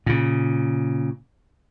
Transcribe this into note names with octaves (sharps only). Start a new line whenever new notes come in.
A#2 C#3